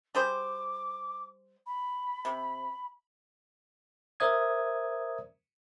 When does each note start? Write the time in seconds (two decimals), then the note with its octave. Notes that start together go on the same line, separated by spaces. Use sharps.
0.15 G3 G#4 C5 D6
1.66 B5
2.25 C3
4.20 A#4 C5 D5 E5 D#6 G#6